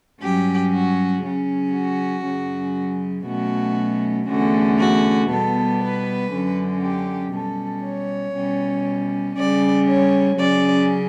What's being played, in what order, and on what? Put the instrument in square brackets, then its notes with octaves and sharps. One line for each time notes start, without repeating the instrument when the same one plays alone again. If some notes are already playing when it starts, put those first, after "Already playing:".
[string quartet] G2 F#3 C#4 G4
F#4
C#3 F#3 C#4
F#4
F#2 C#3 F#3 C#4
B2 F#3 A3 C#4 F#4
E2 D3 A3 C#4 F#4
F#4
B2 G3 B3 A4
B4
F#2 D3 F#3 C#4
G4
B2 G3 C#4 A4
C#5
B2 G3 C#4
C#3 G3 C#4 D5
C#5
C#3 F#3 C#4 D5